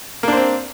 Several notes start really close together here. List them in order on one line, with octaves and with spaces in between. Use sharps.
A#3 D4 C5 C4